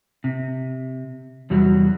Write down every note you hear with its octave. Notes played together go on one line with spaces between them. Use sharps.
C3
E2 C3 F#3 G3 F#4